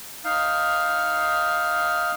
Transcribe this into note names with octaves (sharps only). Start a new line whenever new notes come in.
D#4 F5